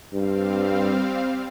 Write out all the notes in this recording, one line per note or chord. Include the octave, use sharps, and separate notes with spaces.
G2 G3 C4 F5